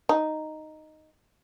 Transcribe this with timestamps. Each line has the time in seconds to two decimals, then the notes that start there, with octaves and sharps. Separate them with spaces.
0.09 D#4